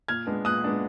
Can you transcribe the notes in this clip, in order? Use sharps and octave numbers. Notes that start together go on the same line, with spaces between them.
A#2 F6 G#6
G#3 B3 D4
A#2 D#6 F#6
G#3 B3 D4